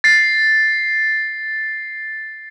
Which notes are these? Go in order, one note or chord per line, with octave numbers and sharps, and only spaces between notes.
A6 C7